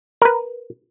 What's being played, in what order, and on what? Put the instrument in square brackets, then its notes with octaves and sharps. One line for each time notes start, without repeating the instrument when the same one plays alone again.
[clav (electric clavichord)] A#4 B4